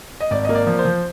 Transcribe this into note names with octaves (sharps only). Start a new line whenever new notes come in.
D#5
G#1 D5
A#3 D#5
D5
F3
C5
F3